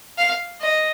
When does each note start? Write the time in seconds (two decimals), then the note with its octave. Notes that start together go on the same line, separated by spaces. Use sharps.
0.18 F5
0.61 D#5